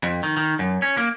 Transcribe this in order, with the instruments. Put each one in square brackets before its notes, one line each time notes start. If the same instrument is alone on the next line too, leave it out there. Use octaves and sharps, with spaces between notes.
[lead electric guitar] F2
D#3
D#3
F#2
C#4
A#3